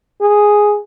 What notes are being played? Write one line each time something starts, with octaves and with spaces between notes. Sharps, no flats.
G#4